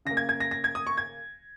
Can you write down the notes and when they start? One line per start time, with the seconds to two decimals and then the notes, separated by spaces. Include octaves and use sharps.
0.05 C#3 A#6
0.11 A#3
0.17 G#6
0.29 G#6
0.40 A#6
0.51 A#6
0.64 G#6
0.75 D#6
0.87 C#6
0.97 G#6